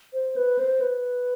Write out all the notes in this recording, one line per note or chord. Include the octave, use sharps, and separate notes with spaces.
C5
B4
C5
B4